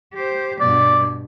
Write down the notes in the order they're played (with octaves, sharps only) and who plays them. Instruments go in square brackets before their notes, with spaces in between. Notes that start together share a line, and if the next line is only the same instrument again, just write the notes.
[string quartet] G4 C5
[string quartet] G2 B2 [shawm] D5